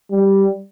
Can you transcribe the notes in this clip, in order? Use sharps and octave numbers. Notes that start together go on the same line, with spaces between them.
G3